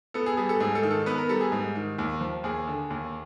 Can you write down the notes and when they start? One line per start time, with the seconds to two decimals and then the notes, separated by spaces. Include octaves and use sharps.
0.14 B3 A4
0.26 G#4
0.37 G3 G#4
0.49 A4
0.60 G#2 G#4
0.75 A4
0.83 D#3
0.90 A4
1.06 B3 B4
1.18 A#4
1.29 G3 A4
1.41 G#4
1.52 G#2
1.76 D#3
1.98 D#2
2.21 F3
2.44 D#2 G#4
2.67 D3
2.90 D#2